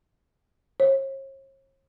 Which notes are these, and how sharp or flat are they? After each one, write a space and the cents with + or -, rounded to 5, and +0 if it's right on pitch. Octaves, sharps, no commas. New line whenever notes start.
C#5 -45